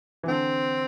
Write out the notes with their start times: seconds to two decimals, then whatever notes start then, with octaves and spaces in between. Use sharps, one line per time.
0.23 E3
0.28 D3 C4